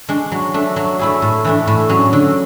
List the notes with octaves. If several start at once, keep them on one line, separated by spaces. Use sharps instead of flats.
G#3 D4
F#3
A3 D4
F#3
A3 E4 G#4
A2
E3 A3 D4
A2
F#3 C#4 G#4
D3